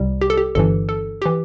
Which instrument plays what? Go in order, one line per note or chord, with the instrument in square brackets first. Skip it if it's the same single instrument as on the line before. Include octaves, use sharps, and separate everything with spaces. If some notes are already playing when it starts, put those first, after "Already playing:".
Already playing: [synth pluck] C2 C3 G3
G4
A4
G4
G1 G2 E3 A4
A4
E3 G4